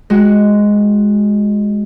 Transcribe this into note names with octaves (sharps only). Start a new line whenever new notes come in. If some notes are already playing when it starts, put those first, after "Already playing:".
G#3 F#4